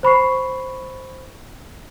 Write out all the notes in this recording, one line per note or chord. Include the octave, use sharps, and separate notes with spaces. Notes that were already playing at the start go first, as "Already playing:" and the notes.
C5 B5 C#6 C7